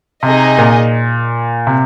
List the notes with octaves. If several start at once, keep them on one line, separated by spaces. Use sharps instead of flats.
C3 D#4 G#4 D#5
A#2
C3